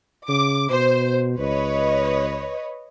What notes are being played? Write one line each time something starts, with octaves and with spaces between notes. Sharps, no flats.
C#3 D6
B2 C5
C#2 B4 C#5 D#5